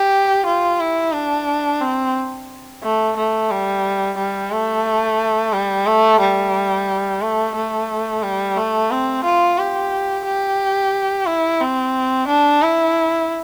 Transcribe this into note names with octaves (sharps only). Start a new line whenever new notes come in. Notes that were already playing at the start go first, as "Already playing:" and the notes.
Already playing: G4
F4
E4
D4
C4
A3
A3
G3
G3
A3
G3
A3
G3
A3
A3
G3
A3
C4
F4
G4
G4
E4
C4
D4
E4